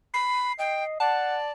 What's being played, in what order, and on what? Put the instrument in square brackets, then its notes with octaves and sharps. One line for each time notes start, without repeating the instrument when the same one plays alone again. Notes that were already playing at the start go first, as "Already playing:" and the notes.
[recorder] B5 [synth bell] C7
[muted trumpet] D#5 [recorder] G5
[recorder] D5 [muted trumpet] F#5 [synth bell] A5